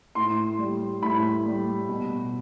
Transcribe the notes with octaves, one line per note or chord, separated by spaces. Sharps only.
A2 C6
G3
A2 B5
G3
B2